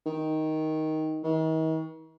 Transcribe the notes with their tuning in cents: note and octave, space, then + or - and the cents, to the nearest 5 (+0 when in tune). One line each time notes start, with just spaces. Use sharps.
D#3 +10
D#3 +40